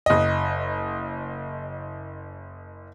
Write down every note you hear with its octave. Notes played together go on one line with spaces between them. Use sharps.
F#1 D#5